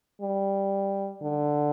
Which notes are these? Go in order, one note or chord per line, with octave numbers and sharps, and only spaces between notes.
G3
D3